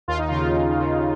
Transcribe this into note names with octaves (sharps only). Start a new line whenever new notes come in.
D#2 F4
D#4
C#3 F4
D#2
C#3